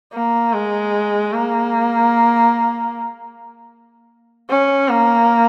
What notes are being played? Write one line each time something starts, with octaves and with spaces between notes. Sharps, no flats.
A#3
G#3
A#3
C#4
A#3